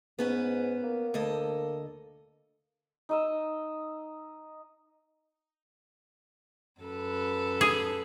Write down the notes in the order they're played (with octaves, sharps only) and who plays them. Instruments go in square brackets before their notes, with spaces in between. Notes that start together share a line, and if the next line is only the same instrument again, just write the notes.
[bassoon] G#2 [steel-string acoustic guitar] B3 C#4 B4
[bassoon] A#3
[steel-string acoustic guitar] D2 A4 D#5
[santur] D#4 D#5 E6
[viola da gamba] F#2 A4 B4
[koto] G#4